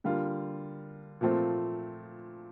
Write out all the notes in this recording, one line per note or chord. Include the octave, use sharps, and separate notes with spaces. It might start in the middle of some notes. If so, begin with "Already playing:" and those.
D3 G3 A#3 F4
A#2 F3 A3 C4